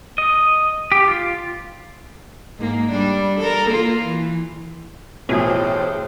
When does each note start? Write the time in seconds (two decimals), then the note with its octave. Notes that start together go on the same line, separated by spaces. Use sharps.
0.18 D#5
0.92 G4
1.08 F4
2.58 G#2 A#3
2.91 G3 D4
3.39 A4 A#4
3.69 A#3 F4
4.03 E3
5.29 A1 B2 F3 A3 C4 G#4 C5